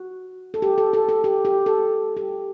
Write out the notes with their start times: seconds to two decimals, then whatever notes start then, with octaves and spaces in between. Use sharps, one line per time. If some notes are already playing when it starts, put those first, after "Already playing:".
Already playing: F#4
0.54 A4
0.62 G4
0.78 A4
0.93 A4
1.09 A4
1.24 G4
1.45 G4
1.66 A4
2.17 G4